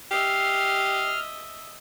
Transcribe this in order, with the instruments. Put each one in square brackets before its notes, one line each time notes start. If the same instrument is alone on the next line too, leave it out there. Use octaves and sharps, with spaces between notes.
[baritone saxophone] G4 [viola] D#5 E5 [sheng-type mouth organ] F6 [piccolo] C7